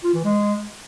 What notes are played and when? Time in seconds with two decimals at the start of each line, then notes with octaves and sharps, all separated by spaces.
0.04 F4
0.14 E3
0.24 G#3